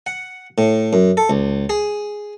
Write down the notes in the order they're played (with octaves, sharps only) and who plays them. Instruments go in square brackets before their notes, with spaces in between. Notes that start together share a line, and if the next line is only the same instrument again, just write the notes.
[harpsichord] F#5
A2
F#2
A4
C#2
G#4